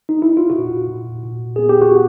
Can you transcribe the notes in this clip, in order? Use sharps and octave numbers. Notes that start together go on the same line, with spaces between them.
D#4
E4
F4
A#2 F#4
A#2
A#2
B3 G#4
G4
F#4